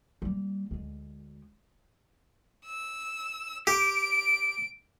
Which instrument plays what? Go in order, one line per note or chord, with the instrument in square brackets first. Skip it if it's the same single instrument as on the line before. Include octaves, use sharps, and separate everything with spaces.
[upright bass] G3 A#3
D2 G#3
[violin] E6
[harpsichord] G4 [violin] D7